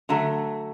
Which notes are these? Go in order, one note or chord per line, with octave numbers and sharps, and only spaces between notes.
D3 F#3 A3